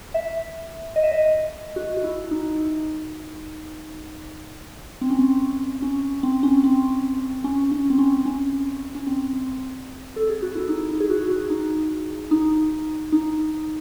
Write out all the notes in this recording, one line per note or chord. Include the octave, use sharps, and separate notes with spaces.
E5
D#5
E5
D#5
F#4
F#4
E4
D#4
C4
C#4
C4
C#4
C4
C#4
C4
C#4
C#4
C4
C#4
C#4
C#4
C4
A4
G#4
F#4
E4
D#4
E4
G#4
F#4
F#4
D#4
D#4
D#4